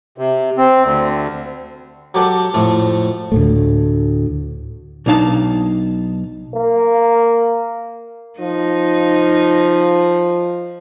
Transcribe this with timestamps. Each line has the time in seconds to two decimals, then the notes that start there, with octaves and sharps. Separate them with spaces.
0.18 C3
0.57 C4
0.84 D2
2.14 F#3 G4 A4 F#5
2.54 F2 A2 A3
3.32 D2 A2 A3
5.06 B1 D4 D#4 F5 A5
6.54 A#3
8.40 F3 D#4